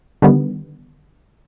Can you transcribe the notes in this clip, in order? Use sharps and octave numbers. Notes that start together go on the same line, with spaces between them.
D3 D#3 G3 B3